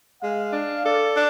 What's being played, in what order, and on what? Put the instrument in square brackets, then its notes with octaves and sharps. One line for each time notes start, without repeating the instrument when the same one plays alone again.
[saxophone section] G#3 [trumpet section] F5
[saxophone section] D4
[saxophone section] A4 [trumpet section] D5
[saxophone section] D4